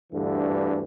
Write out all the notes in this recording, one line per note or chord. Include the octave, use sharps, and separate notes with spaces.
D2 G2 D3 E3